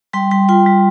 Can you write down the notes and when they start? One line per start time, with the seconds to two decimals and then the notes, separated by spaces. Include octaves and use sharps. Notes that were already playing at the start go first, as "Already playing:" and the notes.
0.13 G3 G5 C6
0.31 G3 G5 C6
0.49 F4 G5 C6
0.66 G3